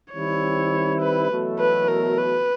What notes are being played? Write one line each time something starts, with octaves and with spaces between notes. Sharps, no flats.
D#3 G3 C4 E4 C#5
B4
E2 B2 F#3 A3
B4
A#4
B4